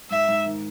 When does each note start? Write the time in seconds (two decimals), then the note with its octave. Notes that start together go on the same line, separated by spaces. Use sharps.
0.10 G#2 E5
0.28 G#2
0.46 D#3